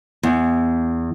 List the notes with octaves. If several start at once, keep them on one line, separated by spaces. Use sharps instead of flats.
E2